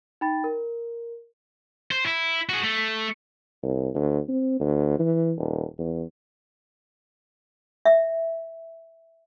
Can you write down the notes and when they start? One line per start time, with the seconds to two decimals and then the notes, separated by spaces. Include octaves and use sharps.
0.21 D#4 G5 B5 A6
0.44 A#4
1.91 C5
2.06 E4
2.49 F#4 G#4
2.64 A3
3.63 C2
3.95 D2
4.29 C4
4.60 D2
4.99 E3
5.38 D#1
5.78 E2
7.85 E5